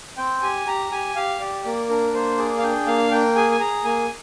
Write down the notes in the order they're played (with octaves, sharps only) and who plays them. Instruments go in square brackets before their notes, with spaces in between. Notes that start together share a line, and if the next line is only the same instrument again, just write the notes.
[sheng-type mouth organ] C4 G5
G4 G#5
G4 A#5
G4 G#5
G4 F5
G4 D5
A#3 D5
D4 A#4
A#3 C5
G#4 D5
F5
D4 G5
A#3 F5
A#3 G5
G#4 G#5
G#5
G#4 A#5
A#3 G#5